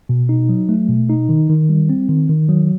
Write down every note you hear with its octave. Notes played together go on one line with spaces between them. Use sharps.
B2
D#4
F#3
A3
B2
D#4
D#3
D#3
G3
C4
D#3
D#3
F#3